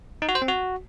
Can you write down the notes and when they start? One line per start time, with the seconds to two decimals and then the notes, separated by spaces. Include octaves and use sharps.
0.22 D#4
0.29 F#4
0.35 C5
0.42 C4
0.48 F#4